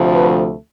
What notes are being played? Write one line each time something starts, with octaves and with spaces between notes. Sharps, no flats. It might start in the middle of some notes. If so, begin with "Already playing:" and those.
Already playing: D2 C3 F3 A3
B4